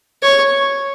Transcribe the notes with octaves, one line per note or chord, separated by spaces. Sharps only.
C#5